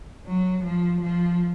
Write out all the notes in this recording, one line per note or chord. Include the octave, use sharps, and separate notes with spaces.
F#3
F3
F3